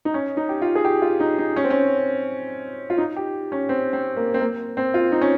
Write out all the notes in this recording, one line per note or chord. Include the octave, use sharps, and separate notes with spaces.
D#4
C#4
D#4
G4
F4
G#4
G4
F4
D#4
D#4
C#4
C4
C#4
F4
D#4
G4
C#4
C4
C4
A#3
C4
A#3
C4
F4
D#4
C#4